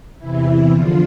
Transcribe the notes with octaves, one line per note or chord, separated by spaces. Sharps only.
E2 C3 E3 E4
E2 D3 F3 F4